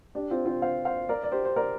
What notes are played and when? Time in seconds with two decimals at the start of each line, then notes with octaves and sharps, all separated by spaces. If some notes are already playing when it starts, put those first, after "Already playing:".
0.15 D4 G4
0.31 C4 F4
0.45 C4 F4
0.62 C5 F5
0.85 C5 F5
1.09 A#4 D5
1.23 D5
1.32 G4 C5
1.45 C5
1.56 A#4 D5